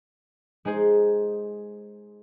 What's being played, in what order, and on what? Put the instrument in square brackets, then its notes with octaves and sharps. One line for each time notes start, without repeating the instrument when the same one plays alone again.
[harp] G#3 D#4 G#4 C5